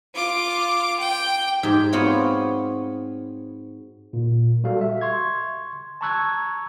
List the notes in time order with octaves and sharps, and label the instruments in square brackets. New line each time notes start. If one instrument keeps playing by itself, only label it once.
[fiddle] F4 D6
G5
[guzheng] G#2 G4
B3 C4 F4 F#4 C#5
[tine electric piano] A#2
G3 F#4 A4 F5
E5
C6 C#6 G#6
A5 A#5 C#6 E6 F#6 G#6